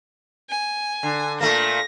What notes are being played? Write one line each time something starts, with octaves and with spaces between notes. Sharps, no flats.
G#5
D3
A#2 A3 A#3 A#6